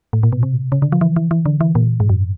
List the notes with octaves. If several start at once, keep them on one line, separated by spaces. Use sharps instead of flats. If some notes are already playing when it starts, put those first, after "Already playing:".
A2
A#2
B2
C3
C#3
D3
F3
E3
E3
E3
D3
E3
A#2
G#2
F#2